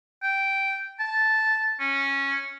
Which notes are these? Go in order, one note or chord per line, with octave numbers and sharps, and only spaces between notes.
G5
A5
C#4